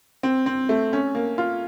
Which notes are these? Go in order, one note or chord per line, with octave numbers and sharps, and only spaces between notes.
C4
C4
A3
C#4
A#3
F4